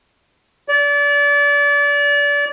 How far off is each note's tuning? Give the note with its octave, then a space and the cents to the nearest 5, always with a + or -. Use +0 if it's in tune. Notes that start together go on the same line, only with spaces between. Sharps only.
D5 -30